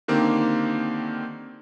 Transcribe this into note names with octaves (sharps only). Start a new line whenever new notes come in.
D3 D#3 A#3 C4 G4